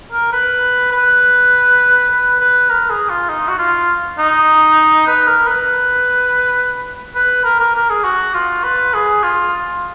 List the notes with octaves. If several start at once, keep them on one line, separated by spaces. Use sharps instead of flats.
A#4
B4
B4
B4
B4
A#4
G#4
F4
D#4
F#4
F4
D#4
B4
A#4
B4
B4
A#4
A#4
A#4
G#4
F#4
F4
B4
G#4
F4